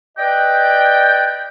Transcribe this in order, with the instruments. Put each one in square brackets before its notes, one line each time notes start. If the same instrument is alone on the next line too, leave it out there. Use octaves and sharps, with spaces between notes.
[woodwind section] B4 D5 D#5 G5